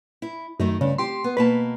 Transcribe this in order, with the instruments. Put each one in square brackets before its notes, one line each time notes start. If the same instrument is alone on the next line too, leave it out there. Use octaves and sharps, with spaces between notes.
[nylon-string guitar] E4
[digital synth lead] F#2 [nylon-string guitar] D#3 A3 D#4
[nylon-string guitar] G2 [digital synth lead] C#3
[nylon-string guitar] C4 G4 [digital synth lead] C6
[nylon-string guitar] B3
[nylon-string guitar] B2 A#3 A5 [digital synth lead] B4